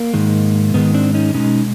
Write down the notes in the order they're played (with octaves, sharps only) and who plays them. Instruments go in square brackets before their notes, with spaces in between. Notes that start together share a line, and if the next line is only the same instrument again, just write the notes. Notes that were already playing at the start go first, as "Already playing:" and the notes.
Already playing: [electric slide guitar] A#3
G#2 D#3 G#3
G#2 D#3 G#3 B3
C4 D4
C#4 D#4
B2 G#3 C#4 D#4